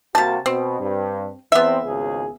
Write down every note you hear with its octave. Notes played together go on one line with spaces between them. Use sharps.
C3 G3 A#3 F#4 A5
B2 C4
G2
E2 B3 C4 E5
G#1 C#2 G#4